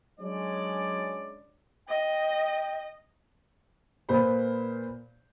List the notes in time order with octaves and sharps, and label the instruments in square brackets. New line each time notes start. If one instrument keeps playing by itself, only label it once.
[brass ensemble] F#3 G#3 C#4 D4 C#5 D5
[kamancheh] D#5 [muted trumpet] G5
[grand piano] A#2 A#3 B4 C5 B5